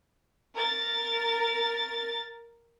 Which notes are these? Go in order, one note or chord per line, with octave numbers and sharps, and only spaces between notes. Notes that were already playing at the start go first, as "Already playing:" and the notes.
A#4 A6